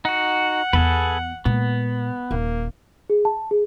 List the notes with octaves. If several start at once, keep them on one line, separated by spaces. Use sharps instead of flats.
D#4 F#4 F#5
E2 B3 G#4 A4 B4
A#2 G#3 B3
D#1 A#3
G#4
A5
G#4